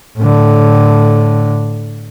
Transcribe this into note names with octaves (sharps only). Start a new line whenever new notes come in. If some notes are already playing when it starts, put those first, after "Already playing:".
A2 D3